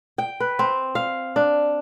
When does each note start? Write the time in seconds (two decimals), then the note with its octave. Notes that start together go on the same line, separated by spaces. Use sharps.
0.18 G5
0.40 B4
0.59 C4
0.95 F5
1.36 D4